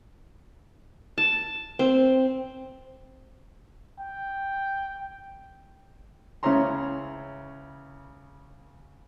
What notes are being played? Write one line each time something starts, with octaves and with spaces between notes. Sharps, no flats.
A5
C4
G5
C#2 C#3 E4 C#5 A#5 C6